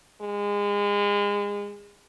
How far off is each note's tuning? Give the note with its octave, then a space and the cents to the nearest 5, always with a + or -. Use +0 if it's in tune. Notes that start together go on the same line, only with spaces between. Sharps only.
G#3 -30